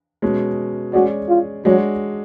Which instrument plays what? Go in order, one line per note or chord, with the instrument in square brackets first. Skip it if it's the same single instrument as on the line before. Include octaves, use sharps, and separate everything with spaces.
[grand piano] B2 G#3 C#4
[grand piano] G#3 C#4 G#4 D5 [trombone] F#4
[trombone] F4
[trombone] F#3 [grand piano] G#3 D4 F#4 C#5